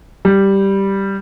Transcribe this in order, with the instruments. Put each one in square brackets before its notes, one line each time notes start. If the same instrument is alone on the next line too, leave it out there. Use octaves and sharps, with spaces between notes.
[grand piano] G3